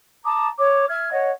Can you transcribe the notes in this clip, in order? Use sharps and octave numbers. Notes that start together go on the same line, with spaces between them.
A5 A#5 D6 D#6
C#5 D6
E5 F6 G#6
C#5 D#5 F#5